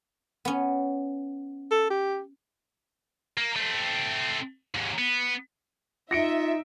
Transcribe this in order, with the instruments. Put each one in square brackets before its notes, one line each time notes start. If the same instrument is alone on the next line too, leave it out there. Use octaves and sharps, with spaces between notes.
[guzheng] B3 C#4
[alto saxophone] A4
G4
[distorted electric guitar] A#3
A3 C4
D#2 G#2
B3
[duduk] D#4 [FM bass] F4 [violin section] E5 [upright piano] A#6 C#7 D7